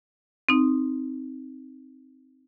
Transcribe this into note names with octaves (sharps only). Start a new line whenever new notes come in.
C4 D#4